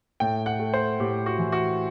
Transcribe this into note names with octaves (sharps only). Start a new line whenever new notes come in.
A2 G5
F#5
A3
C5
A2 G4
F#4
E3
F#4